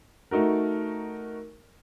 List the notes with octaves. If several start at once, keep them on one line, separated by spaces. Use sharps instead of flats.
A3 D#4 F#4 A#4